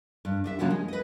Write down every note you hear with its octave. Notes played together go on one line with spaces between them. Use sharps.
G2
D4 D#5 E5
C#3 F3 A#3 C#4 D4 F#4
G#3
B4 D#5